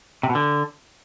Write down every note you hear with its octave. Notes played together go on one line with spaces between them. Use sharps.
C3
B2
D3